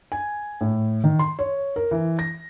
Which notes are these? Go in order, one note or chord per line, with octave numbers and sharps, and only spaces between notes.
G#5
A2
D#3
C6
C#5
A#4
E3
A#6